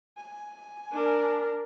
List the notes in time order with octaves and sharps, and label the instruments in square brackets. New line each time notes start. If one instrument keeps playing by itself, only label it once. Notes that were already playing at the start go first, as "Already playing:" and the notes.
[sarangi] G#5
[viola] D4 A#4